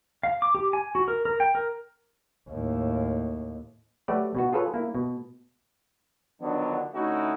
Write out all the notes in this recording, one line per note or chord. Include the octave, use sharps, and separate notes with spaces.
F5
D6
G4
G#5
F#4
A#4
A#4
G5
A#4
D#2 A2
F#3 A3 F#4 G4 B4 D5
B2 B3 F#4
F4 G#4 A4 B4 C#5
A#3 E4
B2
D3 D#3 F3 F#3 B3 D4
D3 A3 C#4 D#4 E4 F#4